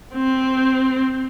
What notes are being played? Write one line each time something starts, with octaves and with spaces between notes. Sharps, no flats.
C4